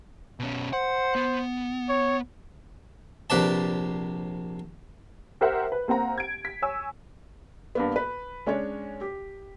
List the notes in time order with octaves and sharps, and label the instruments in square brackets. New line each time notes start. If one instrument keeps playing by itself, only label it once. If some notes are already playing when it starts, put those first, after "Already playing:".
[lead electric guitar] B2 C#4
[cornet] C5 [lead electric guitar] F#5
[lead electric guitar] B3
[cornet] C#5
[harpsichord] A#1 C3 B4 D5 A5
[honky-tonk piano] G4 A#4 C5 E5 F#5 G5
B4
A#3 C4 F#5 A#5
G#6 D7
B6
C#5 G#5 E6
[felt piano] G2 A#3 B3
B4
G#3 C#4 D4 C#5
G4